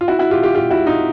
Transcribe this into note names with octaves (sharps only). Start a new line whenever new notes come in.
F4
E4 F#4
E4 F#4
F4 G4
F4 G4
F4 G4
E4 F#4
D#4 F4